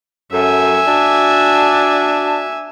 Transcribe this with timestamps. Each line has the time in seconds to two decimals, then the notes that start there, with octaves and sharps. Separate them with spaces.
0.33 F#2 A4 E5 G#5
0.87 D4 F#4